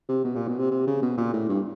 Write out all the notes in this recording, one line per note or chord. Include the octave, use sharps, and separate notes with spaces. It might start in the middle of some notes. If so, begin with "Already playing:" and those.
C3
B2
A#2
B2
C3
C3
C#3
B2
A#2
A2
G2